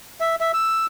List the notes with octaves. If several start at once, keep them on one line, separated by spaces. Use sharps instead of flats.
E5
E5
E6